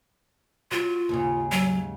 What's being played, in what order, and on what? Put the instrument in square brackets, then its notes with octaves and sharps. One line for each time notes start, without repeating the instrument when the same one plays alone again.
[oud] F#3 [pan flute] F4
[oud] D#2 G#2 C#3
[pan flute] F#3